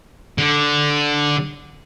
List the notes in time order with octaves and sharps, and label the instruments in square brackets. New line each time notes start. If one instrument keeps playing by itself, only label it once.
[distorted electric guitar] D3